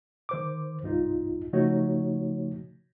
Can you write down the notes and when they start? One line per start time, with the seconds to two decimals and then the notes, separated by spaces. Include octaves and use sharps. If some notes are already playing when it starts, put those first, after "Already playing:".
0.29 D#3 C5 D6
0.83 C2 G2 D#4 F4
1.53 C#3 F3 A3 D#4 F#4 C#5